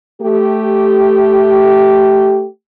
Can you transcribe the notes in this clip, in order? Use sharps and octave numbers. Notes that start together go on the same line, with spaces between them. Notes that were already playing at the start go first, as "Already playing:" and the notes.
A3 G4